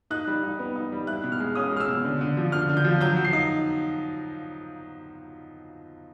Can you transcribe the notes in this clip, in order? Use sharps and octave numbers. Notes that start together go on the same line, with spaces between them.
D#4 F#6
G3
D#4
B3
D#4
G3
E4 F#6
B2
F6
G#3
C#4 D#6
G#3 F6
E6
B2
D3
D3
F3
D3 F6
D3
G6
F3
F#3 G6
F#3
C7
D#4